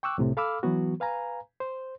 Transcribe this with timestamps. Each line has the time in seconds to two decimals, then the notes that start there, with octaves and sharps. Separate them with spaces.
0.03 G5 C#6 D6 E6 F#6
0.18 C2 A2 C3
0.37 A4 F5 B5 D6 E6 F6
0.63 E3 F#3 B3 F#4
1.00 B4 F5 G#5 A#5
1.60 C5